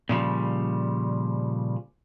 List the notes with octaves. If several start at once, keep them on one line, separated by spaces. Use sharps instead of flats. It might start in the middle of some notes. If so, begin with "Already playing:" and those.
A#2 C#3 F3 G3